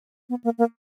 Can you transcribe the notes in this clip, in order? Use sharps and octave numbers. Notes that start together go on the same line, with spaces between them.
B3
A#3
A#3